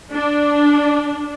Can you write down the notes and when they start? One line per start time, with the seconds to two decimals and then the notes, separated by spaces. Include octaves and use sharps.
0.14 D4